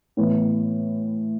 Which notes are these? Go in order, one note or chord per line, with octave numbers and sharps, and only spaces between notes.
A2 E3 B3